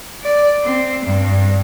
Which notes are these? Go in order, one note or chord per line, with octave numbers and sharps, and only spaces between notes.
D5
C4
G2